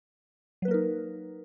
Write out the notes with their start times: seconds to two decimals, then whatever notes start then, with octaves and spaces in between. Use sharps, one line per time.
0.62 F#3
0.65 B4
0.68 A#3
0.71 A#4
0.74 D#4